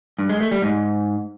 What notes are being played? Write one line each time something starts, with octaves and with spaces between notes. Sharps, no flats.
G2
G#3
A3
G3
G#2